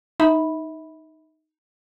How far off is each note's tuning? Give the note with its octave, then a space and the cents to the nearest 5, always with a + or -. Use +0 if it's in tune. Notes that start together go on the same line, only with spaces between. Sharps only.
D#4 +0 E5 -35 B5 -5